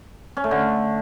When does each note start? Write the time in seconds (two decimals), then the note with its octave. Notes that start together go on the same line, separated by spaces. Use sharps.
0.37 C#4
0.44 A3
0.51 D3